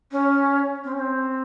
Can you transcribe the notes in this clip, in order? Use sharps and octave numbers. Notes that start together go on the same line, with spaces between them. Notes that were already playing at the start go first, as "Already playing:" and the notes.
C#4
C4
C#4
C4